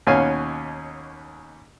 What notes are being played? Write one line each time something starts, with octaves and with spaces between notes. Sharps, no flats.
D#2 B2 C#4 F5 G#5 C#6